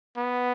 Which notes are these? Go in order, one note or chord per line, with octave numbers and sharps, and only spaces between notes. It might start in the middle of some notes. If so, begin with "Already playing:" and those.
B3